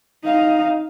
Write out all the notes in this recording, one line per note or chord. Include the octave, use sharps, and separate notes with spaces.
D#4 F5